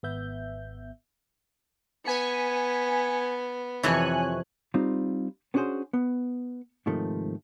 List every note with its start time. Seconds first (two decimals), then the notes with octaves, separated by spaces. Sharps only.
0.03 G#1 B3 E5 G6
2.05 B3 G#5 B6 C#7
3.83 F2 C3 E3 C#5 G#5 F#6
4.74 G3 C4 D#4 F4
5.54 B3 C#4 D4 F#4 G#4 C5
5.93 B3
6.86 G#2 C3 D#3 F3 A3